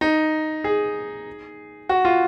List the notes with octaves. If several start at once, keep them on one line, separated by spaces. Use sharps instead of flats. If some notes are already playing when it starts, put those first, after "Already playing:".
D#4
G#4
F#4
F4